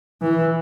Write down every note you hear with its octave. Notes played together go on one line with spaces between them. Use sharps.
E3